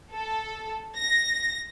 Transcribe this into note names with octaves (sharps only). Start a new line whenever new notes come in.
A4
A#6